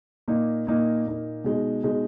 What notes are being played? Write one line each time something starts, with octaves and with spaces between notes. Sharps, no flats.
A#2 A#3 D#4
A#2 A#3 D#4
A#2 A#3 D#4
B2 G#3 D#4
B2 G#3 D#4